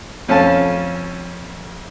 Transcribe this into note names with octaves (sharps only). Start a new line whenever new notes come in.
F2 C#4 F5 A5